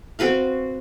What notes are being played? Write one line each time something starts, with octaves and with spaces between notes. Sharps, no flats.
C4 F#4 B4 F5